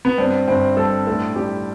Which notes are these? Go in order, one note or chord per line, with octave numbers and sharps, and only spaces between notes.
B3
G2 C4
G1 C4
G2 A4
A2 A4
G3 G4